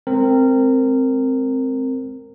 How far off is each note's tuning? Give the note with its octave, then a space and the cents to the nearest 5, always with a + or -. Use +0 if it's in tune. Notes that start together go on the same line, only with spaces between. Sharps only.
G#3 +15 C4 +0 A#4 -20